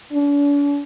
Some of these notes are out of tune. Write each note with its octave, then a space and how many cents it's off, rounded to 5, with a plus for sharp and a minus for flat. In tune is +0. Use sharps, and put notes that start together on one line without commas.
D4 -45